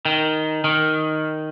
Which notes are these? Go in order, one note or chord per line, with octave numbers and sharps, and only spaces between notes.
D#3
D#3